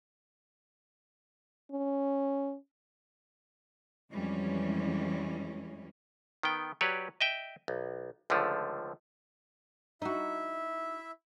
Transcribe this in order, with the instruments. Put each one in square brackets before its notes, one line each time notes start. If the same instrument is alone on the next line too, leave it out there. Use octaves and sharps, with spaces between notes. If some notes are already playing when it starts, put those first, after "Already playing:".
[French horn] C#4
[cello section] F2 E3 G3 G#3 C#4
[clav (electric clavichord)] D#3 B3 G5
F#3 G4 B4 C#5 D5
D#5 E5 G5
B1
C#2 D3 D#3 F3 A3
[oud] D#4 F#4 [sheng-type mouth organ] E4 E5